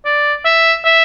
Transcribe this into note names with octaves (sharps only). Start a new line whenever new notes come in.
D5
E5
E5